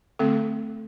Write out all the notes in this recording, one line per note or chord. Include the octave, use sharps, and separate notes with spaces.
D3 A3 C4 A4